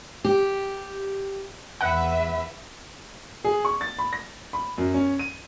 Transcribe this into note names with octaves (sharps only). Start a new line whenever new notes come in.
G4
E2 B4 E5 F#5
G#4
C#6
A6
B5
A#6
B5
F#2
C#4
D#7